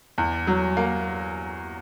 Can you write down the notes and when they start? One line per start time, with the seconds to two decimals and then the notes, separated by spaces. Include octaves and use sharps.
0.18 E2
0.47 F#3
0.77 A#3